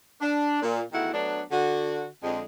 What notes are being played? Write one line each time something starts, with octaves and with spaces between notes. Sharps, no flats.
D4
A#2
E2 D#3 A3 E4 F#4 F#5
F#3 A3 B3 D4
D3 F#4
F2 D3 G#3